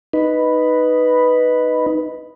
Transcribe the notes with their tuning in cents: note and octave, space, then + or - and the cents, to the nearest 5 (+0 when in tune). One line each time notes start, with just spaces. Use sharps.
D#4 +0 B4 +0